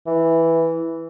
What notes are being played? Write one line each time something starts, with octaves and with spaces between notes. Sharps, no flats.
E3